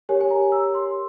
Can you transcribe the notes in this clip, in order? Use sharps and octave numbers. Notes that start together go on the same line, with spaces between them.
G4 A#4 C#5 G#5
G#5
A#5
E6
C6